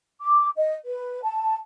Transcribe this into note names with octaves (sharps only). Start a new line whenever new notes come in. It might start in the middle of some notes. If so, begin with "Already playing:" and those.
D6
D#5
B4
A5